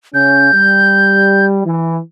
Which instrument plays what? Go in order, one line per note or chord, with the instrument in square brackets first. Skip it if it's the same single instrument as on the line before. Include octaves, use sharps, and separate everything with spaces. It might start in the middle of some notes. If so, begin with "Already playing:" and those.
[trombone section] C#3 C#4 [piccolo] G6
[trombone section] G3
E3